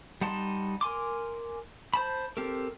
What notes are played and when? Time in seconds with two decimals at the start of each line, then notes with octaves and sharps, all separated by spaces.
0.21 G3 D#4 F#5 A5 C6
0.81 A#4 G#5 C6 D6
1.94 C5 A5 B5
2.37 C4 G4 A4 A#4